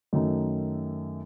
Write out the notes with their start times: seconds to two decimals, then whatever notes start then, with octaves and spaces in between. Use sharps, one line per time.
0.13 F#2 D#3 A3